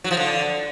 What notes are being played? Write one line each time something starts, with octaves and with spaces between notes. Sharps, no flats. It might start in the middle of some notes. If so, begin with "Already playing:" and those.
F#3
F3
D3